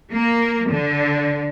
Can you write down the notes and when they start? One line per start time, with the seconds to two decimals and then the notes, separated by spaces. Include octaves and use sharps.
0.12 A#3
0.68 D3